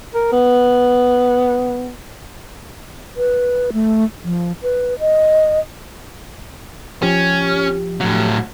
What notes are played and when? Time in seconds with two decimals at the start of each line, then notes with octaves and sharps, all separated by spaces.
0.14 A#4
0.32 B3
3.16 B4
3.73 A3
4.24 F3
4.63 B4
4.99 D#5
7.02 F3 C#4 G4
8.01 A2 F#3